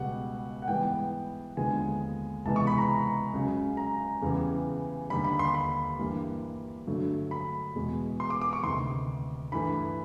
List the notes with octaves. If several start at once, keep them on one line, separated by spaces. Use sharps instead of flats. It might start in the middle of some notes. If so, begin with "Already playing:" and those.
Already playing: C#2 B2 G3 F#5
F#5
G#2 E3 G3 B3 G5
D#2 D3 F3 G#3 B3 G#5
C#2 C3 E3 G#3 B3 A5
C#6
B5
A#5
C#2 C#3 F#3
A#5
E2 C#3 E3 G3
D#2 D3 G3 B5
B5
C6
B5
G2 E3 G3 A#3
G2 D3 F#3 A3
B5
E2 B2 G#3
C6
D6
D6
C#6
D2 C3 D#3 C6
G2 E3 A3 B5